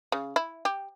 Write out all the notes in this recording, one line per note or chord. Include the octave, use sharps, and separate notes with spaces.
C#3
E4
G4